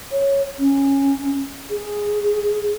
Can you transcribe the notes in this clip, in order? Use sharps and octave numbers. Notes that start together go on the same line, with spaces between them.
C#5
C#4
G#4